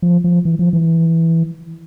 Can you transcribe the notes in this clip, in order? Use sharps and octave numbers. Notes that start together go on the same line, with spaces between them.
F3
F3
E3
F3
E3